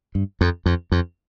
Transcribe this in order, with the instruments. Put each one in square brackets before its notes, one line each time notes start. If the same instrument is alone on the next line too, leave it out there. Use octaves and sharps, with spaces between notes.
[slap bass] G2
F2
F2
F2